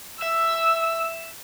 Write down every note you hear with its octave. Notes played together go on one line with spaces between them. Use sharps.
E5 E6